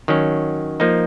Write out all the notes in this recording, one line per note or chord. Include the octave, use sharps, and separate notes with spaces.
D#3 F#3 C#4
F3 A#3 D#4